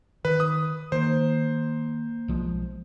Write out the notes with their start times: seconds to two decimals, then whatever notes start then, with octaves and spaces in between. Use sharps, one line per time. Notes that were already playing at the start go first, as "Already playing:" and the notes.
0.25 D#3 B4
0.40 D#6
0.92 D#3 A#3 C5
2.28 B1 F3 G#3